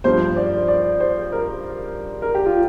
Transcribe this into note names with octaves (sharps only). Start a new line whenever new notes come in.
G2 F3 C5
D5
D5
C5
A#4
A#4
G4
F4